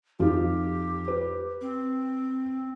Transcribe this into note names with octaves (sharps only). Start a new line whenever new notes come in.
F2 D#4 F4 G4
B4
C4